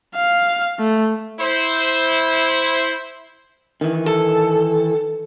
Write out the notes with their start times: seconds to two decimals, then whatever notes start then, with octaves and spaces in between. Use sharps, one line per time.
0.16 F5
0.79 A3
1.40 E4 C5
3.81 D#3 E3
4.06 A4